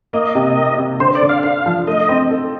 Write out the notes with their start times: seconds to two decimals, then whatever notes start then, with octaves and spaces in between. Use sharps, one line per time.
0.13 A#3 D#5
0.35 C3
0.57 A#3
0.78 C3
1.00 D3 C5
1.15 D5
1.22 D3
1.29 F5
1.43 D4 F5
1.66 F3
1.87 A3 D#5
2.09 C4
2.31 A4